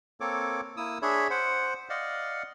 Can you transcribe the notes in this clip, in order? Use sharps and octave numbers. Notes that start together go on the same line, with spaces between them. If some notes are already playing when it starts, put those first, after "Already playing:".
A#3 C4 A4 C#5 D6
A#3 E4 D#6 E6
D4 G#4 C#5 E5 B5
C5 F#5
D5 D#5 F5 F#5